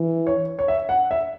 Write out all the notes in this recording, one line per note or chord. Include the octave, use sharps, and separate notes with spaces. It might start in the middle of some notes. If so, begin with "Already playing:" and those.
Already playing: E3
C#5
C#5
E5
F#5
E5